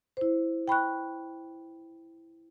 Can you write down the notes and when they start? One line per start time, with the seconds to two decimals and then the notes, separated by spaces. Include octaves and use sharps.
0.17 E4 C5
0.68 G5 B5 C#6 F#6